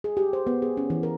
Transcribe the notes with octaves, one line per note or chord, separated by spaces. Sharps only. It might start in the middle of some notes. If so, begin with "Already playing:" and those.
G#4
G4
C5
B3
G#4
C#4
E3
A#4